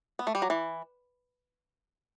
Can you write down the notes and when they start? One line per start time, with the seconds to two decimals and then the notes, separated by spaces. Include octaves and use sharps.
0.19 B3
0.27 A3
0.35 G3
0.42 F#3
0.50 E3